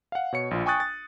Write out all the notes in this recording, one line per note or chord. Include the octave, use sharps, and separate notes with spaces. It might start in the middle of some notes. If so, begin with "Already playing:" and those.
F5 F#5
B2 C#5 C#7
A#1 F4
G5 G#5 C#6 D#6 F#6 A6
A6